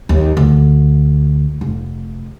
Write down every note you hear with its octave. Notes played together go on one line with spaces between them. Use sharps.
D#2
D2
F1